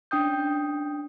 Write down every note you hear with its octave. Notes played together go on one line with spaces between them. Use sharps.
C#4 D4 G5 D#6 G6